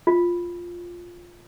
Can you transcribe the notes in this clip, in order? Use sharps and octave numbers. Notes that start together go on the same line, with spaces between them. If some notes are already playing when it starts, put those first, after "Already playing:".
F4